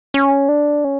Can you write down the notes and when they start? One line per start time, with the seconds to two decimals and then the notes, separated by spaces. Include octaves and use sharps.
0.14 C#4
0.49 D4
0.84 C#4